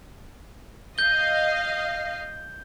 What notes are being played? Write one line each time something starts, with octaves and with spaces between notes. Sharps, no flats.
D#5 F5 G6 G7